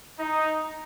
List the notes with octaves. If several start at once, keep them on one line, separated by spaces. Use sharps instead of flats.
D#4